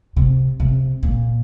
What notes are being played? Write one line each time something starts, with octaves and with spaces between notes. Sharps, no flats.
C3
C3
A#2